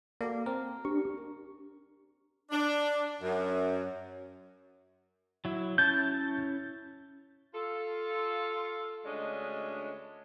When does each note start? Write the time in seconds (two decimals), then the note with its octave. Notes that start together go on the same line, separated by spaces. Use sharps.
0.21 A#3 F#4 A4 D5
0.46 C4 A#4
0.85 D4 G4 C#6
2.50 D4
3.22 F#2
5.45 F#3 E4
5.78 C#4 E4 A5 G6
7.54 F4 A4
9.05 D2 G#3 C#4 D4 D#5